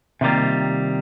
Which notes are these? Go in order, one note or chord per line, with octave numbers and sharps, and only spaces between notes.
C3 D#3 G3 A#3 F4